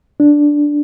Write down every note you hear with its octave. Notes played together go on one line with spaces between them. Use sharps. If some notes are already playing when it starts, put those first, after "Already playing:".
D4